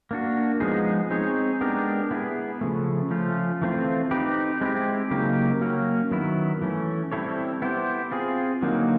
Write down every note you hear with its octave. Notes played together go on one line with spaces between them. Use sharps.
A#3 D4 F#4
F3 G#3 B3 D#4 G#4
C4 D#4 G#4 C#5
G#3 B3 D4 G4 A#4
B3 E4 G#4
C#3 F3 A3
F3 A3 C#4 F4
E3 A3 C4 F4
C4 D#4 G4 B4
G#3 C4 E4 G4
C#3 F#3 A#3 D#4 G4
F#3 A#3 C#4
D#3 F#3 B3 E4
E3 A3 C#4
G3 C4 E4 A4 C#5
B3 E4 G4 C5
C4 F4 G#4
D3 F#3 A#3 D#4